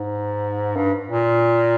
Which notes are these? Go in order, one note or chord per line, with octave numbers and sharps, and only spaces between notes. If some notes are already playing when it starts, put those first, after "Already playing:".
Already playing: G#2
G2
A#2